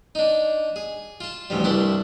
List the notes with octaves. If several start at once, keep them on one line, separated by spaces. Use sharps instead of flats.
D4 D#4
G#4
F4 A5
A1 D2 D3 F3 G3
C2 G2 D4 E4 C6